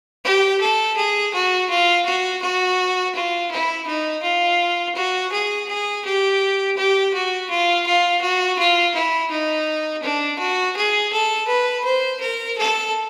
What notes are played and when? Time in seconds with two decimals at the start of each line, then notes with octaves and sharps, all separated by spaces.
0.25 G4
0.61 A4
0.96 G#4
1.34 F#4
1.70 F4
2.05 F#4
2.42 F#4
3.15 F4
3.51 E4
3.86 D#4
4.23 F4
4.96 F#4
5.32 G#4
5.68 G#4
6.05 G4
6.77 G4
7.14 F#4
7.50 F4
7.86 F4
8.21 F#4
8.59 F4
8.94 E4
9.31 D#4
10.03 D4
10.39 F#4
10.76 G#4
11.12 A4
11.48 B4
11.84 C5
12.20 A#4
12.57 A4